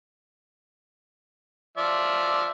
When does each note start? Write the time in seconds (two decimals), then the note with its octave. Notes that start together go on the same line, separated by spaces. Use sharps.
1.77 F3 D5 E5